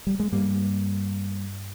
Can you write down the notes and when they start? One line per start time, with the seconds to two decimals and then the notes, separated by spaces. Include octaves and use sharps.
0.07 G3
0.20 G#3
0.32 G2 G3 A#3